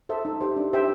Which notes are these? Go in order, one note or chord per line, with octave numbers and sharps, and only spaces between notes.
A4 C5 E5
D#4
G4 C5
D4
G4 C5 E5 G5